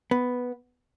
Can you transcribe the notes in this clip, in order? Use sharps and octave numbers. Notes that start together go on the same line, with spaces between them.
B3